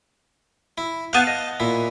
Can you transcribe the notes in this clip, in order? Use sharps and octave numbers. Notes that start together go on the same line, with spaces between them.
E4
B3 F5 A5 G6
D#5
A#2 E4